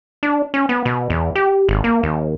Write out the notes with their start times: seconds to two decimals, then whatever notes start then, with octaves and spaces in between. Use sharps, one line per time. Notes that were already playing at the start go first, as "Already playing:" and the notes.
0.23 D4
0.54 C#4
0.69 B3
0.85 B2
1.10 E2
1.35 G4
1.69 G#1
1.84 A#3
2.03 D#2